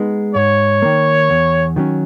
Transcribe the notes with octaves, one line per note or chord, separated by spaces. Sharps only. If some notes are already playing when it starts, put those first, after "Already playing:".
Already playing: G#3 B3 D#4
G#2 C#5
D#3 A#3
E2
D#3 F#3 C#4